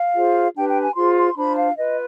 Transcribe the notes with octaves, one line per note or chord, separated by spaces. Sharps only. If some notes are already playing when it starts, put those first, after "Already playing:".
Already playing: F5
F4 G#4 C5
D4 G4 B4 G5
G5
G#5
F4 G#4 C5 C6
C6
D4 F4 C5 B5
F5
F4 B4 D#5